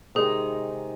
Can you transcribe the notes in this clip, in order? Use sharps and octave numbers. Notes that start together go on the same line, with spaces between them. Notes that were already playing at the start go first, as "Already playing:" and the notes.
C3 D#3 G#3 D#4 G#4